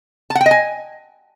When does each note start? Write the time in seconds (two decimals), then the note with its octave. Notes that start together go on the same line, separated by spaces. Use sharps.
0.30 A5
0.35 F#5
0.41 G5
0.46 D#5
0.51 G#5